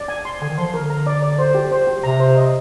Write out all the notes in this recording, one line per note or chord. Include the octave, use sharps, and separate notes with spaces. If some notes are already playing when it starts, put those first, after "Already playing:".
Already playing: D5
G#5
C6
D3 G#5
D#3
F3 C6
D3 A#4
A#5
D5
D5
C5
G4
C5
G4
C3 A#5
C5
D#5